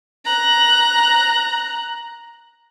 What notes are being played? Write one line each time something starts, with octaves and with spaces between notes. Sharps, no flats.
A#5 F#6